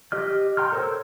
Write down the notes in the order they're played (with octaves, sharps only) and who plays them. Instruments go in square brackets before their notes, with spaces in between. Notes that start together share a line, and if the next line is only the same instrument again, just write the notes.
[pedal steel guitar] G4 D#5 F6
G5 A#5 C6 F6
A4 A#4 C5 C#5 E6